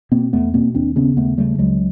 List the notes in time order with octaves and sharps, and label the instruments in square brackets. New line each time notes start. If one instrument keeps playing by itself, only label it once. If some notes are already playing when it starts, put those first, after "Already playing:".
[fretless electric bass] B2 A#3 C4
E2 A3 B3
B2 A#3 C4
D#2 C4 D4
C#3 B3 C#4
D#2 A3 B3
C#3 G3 A3
C#2 F#3 G#3